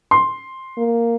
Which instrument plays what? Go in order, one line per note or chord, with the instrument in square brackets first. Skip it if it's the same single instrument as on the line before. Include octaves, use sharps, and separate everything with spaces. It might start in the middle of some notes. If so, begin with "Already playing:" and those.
[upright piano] C6
[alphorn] A#3